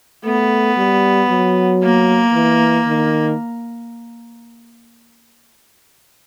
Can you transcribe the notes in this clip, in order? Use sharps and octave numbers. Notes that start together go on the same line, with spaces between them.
A3 B3
G3
F#3
A#3
E3
D#3